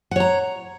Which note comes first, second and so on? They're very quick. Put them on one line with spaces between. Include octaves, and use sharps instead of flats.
F#5 C#5 A#5